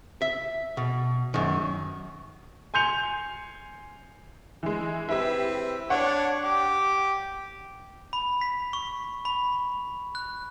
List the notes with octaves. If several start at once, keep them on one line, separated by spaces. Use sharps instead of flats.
E5
B2
F#2 D#3
G#5 C6 G6 C#7 F7
E3 G#3
C4 E4 G4 B4 E5
D4 C#5 F#5 C#6
G4 D6
B5
B6
C#6
B5
F#6